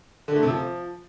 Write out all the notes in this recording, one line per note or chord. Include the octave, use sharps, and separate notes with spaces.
D3
A3
C3
F3